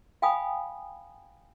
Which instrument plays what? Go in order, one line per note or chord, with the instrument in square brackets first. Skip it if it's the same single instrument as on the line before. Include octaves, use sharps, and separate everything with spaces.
[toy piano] F5 G5 G#5 B5 D#6